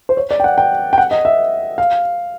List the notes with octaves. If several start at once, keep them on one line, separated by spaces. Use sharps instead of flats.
C5
C#5
D5
G5
F#5
G5
G5
F#5
D#5
E5
F5